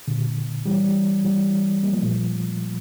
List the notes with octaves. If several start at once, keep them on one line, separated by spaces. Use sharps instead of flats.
A#2 D3
E3 G3
E3 G3
G3 A#3
F3 A3
A#2